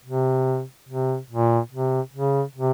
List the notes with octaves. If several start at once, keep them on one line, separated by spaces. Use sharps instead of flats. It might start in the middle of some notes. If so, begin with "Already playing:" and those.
C3
C3
A#2
C3
C#3
C3